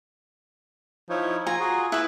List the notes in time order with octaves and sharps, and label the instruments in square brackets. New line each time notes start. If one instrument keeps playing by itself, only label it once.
[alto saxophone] F3 [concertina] D#4 E4 C#5
[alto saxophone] F4 [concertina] G#5 [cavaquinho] A#5
[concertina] F#4 G#4
[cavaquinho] E4 B4 [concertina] G#4 E6 F#6